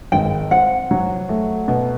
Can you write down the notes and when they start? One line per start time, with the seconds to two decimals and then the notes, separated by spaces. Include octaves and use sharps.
0.12 G#1 G5
0.51 C4 F#5
0.91 F#3
1.29 A3
1.68 B2